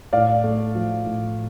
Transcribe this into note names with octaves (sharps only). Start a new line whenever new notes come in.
A2 D5 F5
A3
F3
A2